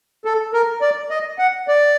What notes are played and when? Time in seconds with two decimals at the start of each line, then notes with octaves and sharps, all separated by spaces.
0.25 A4
0.54 A#4
0.81 D5
1.10 D#5
1.39 F#5
1.68 D5